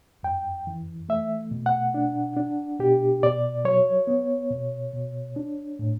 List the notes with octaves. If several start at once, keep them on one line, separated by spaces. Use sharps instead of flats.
F#2 G5
E3
A3 E5
B2
F#5
D4
D4
B2 G4
B2 D5
F#3 C#5
B3
B2
B2
D4
A2